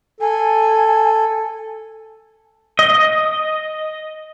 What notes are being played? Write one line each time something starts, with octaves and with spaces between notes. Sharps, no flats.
A4 G#5
D#5